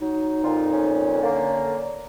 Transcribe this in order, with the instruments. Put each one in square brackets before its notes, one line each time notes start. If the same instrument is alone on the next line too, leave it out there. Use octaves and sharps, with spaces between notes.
[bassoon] F#3 [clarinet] D#4
[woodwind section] F2 A#2 [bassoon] F4
[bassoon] C#4
[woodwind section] D3 A#3